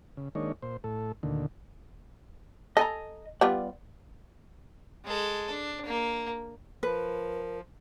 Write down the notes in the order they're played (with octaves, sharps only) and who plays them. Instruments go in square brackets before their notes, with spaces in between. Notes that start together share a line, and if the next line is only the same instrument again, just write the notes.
[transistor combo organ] C#3
D#3 G#3 A#3 D4 D#4 C#5
A#2 C5
A2 A4
D2 A#2 D3 D#3
[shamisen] A4 [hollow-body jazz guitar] D#5 G#5 A#5
[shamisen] G3 B3 F4 [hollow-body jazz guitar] D5
[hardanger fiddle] G#3 A4
D4
A#3
[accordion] F3 [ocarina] A#4 [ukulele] B4